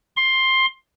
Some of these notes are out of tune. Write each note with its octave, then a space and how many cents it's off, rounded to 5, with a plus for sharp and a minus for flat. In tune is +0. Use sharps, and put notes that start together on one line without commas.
C6 +15